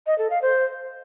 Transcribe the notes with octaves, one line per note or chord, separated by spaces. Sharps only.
D#5
A4
F5
C5